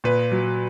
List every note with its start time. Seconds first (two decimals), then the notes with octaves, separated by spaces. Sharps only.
0.04 A#2 B4
0.32 F#3